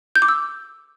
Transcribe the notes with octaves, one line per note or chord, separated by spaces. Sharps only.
G6
D6
E6